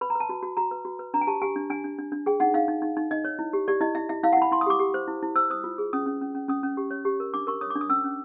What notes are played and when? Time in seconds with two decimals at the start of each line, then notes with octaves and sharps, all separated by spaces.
0.01 B4 B5
0.10 A#5
0.15 B4 A5
0.29 F#4
0.43 F#4
0.57 F#4 A#5
0.71 B4
0.85 F#4
0.99 B4
1.14 D4 A#5
1.21 G#5
1.27 G4 A5
1.42 G4 G#5
1.56 D4
1.70 D4 G#5
1.84 D4
1.99 D4
2.12 D4
2.26 G#4 G5
2.40 D#4 F#5
2.54 D#4 F5
2.68 D#4
2.82 D#4
2.97 D#4
3.11 D#4 D#5
3.25 C#5
3.39 E4
3.53 G4
3.68 G4 D5
3.81 E4 D#5
3.95 E4 E5
4.09 E4 E5
4.23 E4 F5
4.33 F#5
4.37 E4 B5
4.51 E4 C6
4.61 D#6
4.66 G4 D6
4.79 G4
4.94 C5
5.08 E4
5.23 E4
5.36 C5 E6
5.50 C5 D#6
5.64 F4
5.78 G#4
5.93 C#4 D#6
6.06 C#4
6.21 C#4
6.35 C#4
6.48 C#4 D#6
6.63 C#4
6.77 G4
6.91 C#5
7.05 G4
7.20 A#4
7.34 D4 D6
7.47 A#4 C#6
7.61 C#5 D#6
7.70 D6
7.76 D4
7.81 D#6
7.89 C#4 E6
8.04 C#4